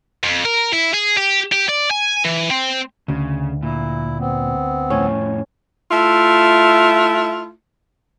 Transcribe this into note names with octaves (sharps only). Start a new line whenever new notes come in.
F2
A#4
E4
G#4
G4
G4
D5
G#5
E3
C4
D2 C#3
A#2 E4
B3 C4
F2 A2 C#4
A3 E4 F4